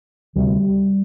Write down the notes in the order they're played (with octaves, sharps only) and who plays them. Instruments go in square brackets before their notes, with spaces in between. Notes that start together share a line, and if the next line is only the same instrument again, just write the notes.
[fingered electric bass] D2 C3 G3